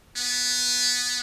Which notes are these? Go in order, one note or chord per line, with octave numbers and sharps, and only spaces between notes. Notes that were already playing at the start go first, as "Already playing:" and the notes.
B3